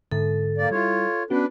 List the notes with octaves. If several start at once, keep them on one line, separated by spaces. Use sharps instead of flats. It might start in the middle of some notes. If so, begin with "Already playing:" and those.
G#2 D3 A4
A#3 D5
G3 E4 F4 C#5
B3 C#4 D4 F#4 B4